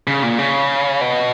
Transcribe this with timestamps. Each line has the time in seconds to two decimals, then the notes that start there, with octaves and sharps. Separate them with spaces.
0.07 C#3
0.23 A#2
0.39 C#3
1.01 B2